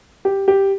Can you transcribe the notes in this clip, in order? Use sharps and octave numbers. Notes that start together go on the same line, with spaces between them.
G4
G4